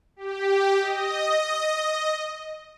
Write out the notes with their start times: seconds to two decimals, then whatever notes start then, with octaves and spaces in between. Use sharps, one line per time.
0.16 G4
0.79 D#5